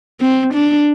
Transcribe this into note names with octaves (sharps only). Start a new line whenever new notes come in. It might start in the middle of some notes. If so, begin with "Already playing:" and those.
C4
D4